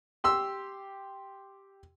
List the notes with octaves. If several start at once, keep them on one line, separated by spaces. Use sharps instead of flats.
G4 C6 E6